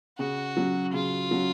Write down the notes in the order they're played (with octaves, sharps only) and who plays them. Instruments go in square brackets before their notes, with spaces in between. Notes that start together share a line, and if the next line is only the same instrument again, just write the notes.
[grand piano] C#3 [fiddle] F#4
[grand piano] F#3 C#4
[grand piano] C#3 [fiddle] F4
[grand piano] F#3 C#4